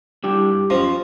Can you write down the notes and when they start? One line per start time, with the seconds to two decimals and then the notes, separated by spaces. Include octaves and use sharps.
0.24 G3 D4 E4 G4
0.51 G2
0.70 F#2 F3 C#4 D#5